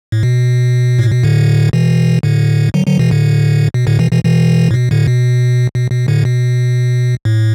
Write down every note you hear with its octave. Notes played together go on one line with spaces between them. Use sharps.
A2
B2
A2
B2
A2 D3
B2 E3
A2 D3
D3 F#3
D3 F#3
B2 E3
A2 D3
B2
A2 D3
B2 E3
B2 E3
B2 E3
A2
B2
A2 D3
B2
B2
B2
A2 D3
B2
A2